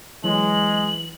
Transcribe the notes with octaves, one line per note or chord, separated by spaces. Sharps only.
E3 F#3 G#3 F#7